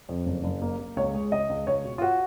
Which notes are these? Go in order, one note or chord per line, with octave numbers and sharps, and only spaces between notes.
F2
F#1
F#1
A#3
A#3
C#2 C#5
G#3
C#2 D#5
C#2
C#2 C#5
B2
F4
F#4